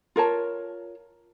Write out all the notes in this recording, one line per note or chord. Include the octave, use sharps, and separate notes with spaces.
F4 A#4 C#5 A5